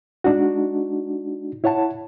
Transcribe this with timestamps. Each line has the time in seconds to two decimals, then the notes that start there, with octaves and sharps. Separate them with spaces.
0.24 G#3 D4 D#4 F#4
1.64 E4 C#5 F#5 A5